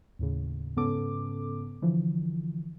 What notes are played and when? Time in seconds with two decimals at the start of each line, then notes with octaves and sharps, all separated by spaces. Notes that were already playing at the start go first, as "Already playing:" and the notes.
0.19 D#2 A2 C#3
0.76 G#2 C#3 B3 C#4 A4 D6
1.82 D3 E3 F3